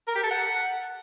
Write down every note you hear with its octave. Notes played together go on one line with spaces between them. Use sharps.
A#4
G4
A4
F#5